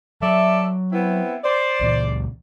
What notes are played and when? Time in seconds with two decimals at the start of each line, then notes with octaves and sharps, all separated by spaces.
0.22 F#3 A4 D5 E5
0.93 B3 C4 E4
1.44 C5 D5
1.81 C#2 A#2 E3